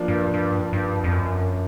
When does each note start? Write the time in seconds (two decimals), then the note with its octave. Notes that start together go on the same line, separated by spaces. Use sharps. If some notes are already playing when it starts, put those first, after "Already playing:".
Already playing: F3 A#3 D4
0.08 G2
0.34 G2
0.73 G2
1.04 F2
1.12 F#2